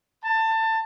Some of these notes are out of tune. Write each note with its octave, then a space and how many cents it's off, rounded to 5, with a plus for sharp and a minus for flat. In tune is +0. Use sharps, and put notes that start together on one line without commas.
A5 +20